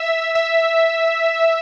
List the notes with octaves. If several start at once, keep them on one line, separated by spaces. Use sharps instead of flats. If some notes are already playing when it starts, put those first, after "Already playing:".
Already playing: E5
E5